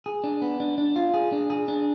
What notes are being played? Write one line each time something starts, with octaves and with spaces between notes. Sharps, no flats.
G#4
D4
B3
D4
D4
F4
G#4
D4
G#4
D4